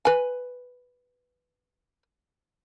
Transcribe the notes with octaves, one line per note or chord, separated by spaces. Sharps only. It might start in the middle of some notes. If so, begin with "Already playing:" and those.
B4 G#5